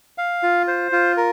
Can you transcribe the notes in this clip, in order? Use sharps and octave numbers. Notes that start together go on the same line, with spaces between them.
F5
F4
C5
F4
A#4